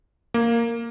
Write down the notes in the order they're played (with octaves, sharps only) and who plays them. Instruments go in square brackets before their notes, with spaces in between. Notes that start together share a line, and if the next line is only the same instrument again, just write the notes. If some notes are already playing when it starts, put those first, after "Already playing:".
[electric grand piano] A#3